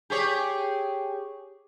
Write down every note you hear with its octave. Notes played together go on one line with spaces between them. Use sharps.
G4 G#4 C#5